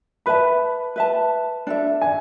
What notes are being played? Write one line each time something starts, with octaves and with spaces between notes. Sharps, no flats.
B4 E5 A5 B5
B4 E5 A5
D4 A4 E5
G#5